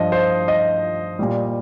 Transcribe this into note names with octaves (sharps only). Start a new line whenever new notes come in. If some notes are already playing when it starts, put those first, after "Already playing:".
Already playing: G2 F3 D#5
C5
D#5
A#2 G3